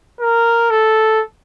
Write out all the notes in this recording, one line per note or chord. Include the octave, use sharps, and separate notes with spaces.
A#4
A4